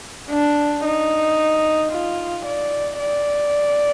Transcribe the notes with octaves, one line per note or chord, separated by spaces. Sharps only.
D4
D#4
F4
D5
D5